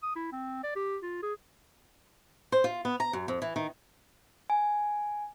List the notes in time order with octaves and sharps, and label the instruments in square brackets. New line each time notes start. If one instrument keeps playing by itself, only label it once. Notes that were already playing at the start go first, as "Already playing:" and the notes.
[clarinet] D#6
E4
C4
D5
G4
F4
G#4
[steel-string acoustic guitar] C5
F4
B3
A#5
F#2
F2
E3
D#3
[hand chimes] G#5